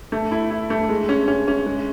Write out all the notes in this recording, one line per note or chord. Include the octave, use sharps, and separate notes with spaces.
A3
E4
E4
A3
G#3
C#4
C#4
C#4
G#3